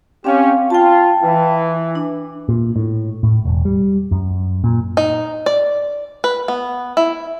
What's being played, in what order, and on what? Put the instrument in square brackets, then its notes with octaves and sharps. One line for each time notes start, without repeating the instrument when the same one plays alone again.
[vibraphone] C4 F5 [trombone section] C#4 G4
[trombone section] F4 [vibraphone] G5 A5
[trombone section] E3
[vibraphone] D4
[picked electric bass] A#2
A2
A2
E1
G3
F#2
A#2
[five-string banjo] D#4
D5
B4
B3
E4